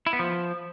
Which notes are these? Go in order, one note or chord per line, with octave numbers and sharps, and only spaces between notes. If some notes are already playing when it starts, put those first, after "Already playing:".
E4
B3
F3